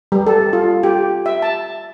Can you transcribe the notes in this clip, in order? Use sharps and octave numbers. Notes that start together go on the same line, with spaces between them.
G3
A4
F4
G4
E5
A5